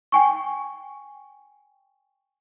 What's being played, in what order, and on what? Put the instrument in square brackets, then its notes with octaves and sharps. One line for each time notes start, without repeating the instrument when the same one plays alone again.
[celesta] G5 G#5 C#6